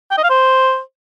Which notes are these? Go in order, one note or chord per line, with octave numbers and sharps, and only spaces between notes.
G5
D#5
F5
C5